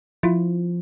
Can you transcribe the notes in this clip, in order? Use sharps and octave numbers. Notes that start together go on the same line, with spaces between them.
F3 E4 F4